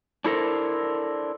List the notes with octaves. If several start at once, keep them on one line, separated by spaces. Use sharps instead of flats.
D4 E4 A4 A#4 C5